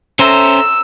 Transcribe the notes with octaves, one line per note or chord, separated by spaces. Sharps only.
C#4 A4 C5 E5 A#5 E6